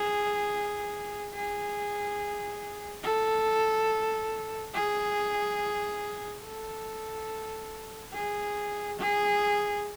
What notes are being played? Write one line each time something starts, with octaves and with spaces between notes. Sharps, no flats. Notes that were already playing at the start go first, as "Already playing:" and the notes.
Already playing: G#4
G#4
A4
G#4
A4
G#4
G#4